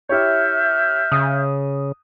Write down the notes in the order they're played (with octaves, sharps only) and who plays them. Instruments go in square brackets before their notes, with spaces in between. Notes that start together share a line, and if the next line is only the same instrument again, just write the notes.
[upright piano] E4 G4 C#5 [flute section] E5 F6 G6
[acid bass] C#3 [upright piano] D#6